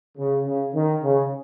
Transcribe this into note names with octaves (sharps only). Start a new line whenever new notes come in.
C#3
C#3
D#3
C#3